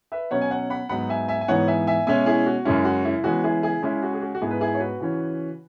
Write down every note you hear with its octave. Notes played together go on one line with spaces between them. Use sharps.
B4 E5
B2 F#3 C#4 C#5 F#5
G#5
C#5 F#5
F#5 B5
G#2 F#3 B3 F#5 B5
E5 G#5
E5 G#5
G#5
G#2 E3 B3 C#5 F#5
E5 G#5
E5 G#5
B2 G#3 C#4 E5 G#5
E4 G#4
F#4
F#2 C#3 G#3 C#4 E4
F#4
E4
C#3 E3 G#3 B3 F#4
E4 G#4
E4 G#4
C#3 G#3 C#4 E4
F#4
G#4
F#4
F#4
G#2 G#3 B3 E4 G#4
B4
E4 G#4
C#5
F#4 B4
C#3 E3 C#4